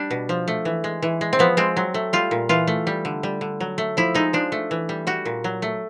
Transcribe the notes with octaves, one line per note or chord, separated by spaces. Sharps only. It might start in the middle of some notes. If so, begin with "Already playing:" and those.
Already playing: G3 D4
B2
F3
A3
E3
G#3
E3
G#3
C4
F3 B3
G#3 C4
F#3
A3
G3 F4
A#2
E3 F4
A3
G3
D3
G3
D3
F#3
A3
F3 E4
G#3 D#4
F3 D4
A3
E3
G3
G3 F#4
A#2
F#3
A3